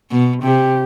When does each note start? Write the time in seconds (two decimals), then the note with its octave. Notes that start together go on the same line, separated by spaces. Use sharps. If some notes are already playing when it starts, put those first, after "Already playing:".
0.10 B2
0.44 C3 G4